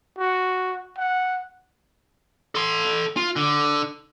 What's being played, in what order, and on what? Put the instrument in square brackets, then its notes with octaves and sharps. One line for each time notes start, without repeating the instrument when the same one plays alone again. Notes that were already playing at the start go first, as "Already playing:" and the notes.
[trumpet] F#4
F#5
[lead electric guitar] A4 C6
F4
D3